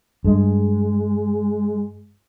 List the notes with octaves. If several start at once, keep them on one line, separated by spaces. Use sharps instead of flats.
G2 G#3